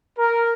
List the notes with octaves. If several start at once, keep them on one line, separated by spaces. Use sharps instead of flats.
A#4